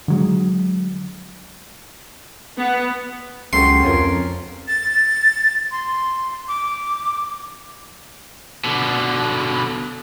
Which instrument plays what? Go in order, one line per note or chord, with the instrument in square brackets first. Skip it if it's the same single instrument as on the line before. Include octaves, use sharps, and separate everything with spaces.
[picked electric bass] D3 F#3 G#3
[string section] B3
[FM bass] C#2 [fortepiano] F#2 G4 A4 [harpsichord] C6
[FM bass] F2 [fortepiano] C#4 F4 A#4
[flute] A6
C6
D6
[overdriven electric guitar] B2 D3